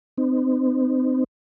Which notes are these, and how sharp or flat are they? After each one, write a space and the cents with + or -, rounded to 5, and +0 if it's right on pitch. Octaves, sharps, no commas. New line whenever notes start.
C4 -30 D#4 -30